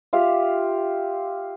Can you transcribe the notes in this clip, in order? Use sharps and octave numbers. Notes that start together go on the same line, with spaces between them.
F4 G4 E5 F5